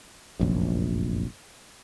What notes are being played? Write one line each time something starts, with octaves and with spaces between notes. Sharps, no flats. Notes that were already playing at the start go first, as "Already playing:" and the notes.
F1 A#1 F#2